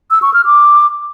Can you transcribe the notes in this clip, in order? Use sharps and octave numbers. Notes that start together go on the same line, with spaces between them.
E6
C#6
F6
D6